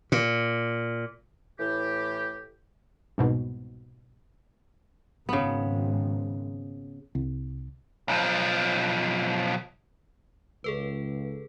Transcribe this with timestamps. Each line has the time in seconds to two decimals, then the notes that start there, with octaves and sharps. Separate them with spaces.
0.12 A#2
1.59 A2 E3 G4
3.18 C2 G#2 B2
5.29 G#1 C#3 B3
7.15 C2
8.08 B1 F3
10.64 C#2 G#4 A4 B4